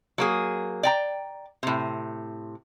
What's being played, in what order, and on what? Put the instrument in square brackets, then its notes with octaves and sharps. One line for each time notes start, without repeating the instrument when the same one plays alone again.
[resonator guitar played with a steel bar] F#3 A#3 G#4
D5 G5 A#5
A2 C3